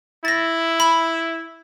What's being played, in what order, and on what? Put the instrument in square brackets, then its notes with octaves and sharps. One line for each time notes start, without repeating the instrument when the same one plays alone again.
[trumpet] E4 [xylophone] A6 A#6
[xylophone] B5